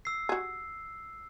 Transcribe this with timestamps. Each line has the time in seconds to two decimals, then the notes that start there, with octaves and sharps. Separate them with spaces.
0.05 E6 C7
0.29 F#4 G#4